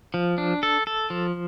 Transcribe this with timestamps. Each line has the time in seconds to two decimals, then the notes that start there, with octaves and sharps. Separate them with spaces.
0.14 F3
0.38 D4
0.63 A4
0.87 A4
1.10 F3